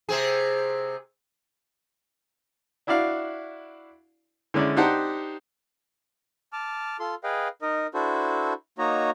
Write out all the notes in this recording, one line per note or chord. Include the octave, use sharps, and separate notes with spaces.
C3 C4 G#4
D4 E4 F#4 D5 F5
D3 G#3 C#4 E4 D5
D4 D#4 G4 C5 F#5 A5
A5 D6 F6
F4 A4 C6
G#4 B4 D#5 F5 G5
D#4 A#4 D#5
D4 E4 F#4 A4 C5
A#3 D#4 F#4 C#5 D#5 A#5